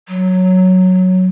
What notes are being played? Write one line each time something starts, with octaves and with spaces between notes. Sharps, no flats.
F#3